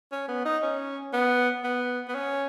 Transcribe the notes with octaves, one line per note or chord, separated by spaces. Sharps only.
C#4
B3
D#4
C#4
B3
B3
B3
C#4